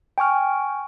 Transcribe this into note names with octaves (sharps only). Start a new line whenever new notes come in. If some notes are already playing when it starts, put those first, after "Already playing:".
G5 G#5 C#6 F6